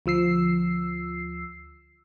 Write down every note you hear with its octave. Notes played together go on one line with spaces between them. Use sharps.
D2 F3 E6 C7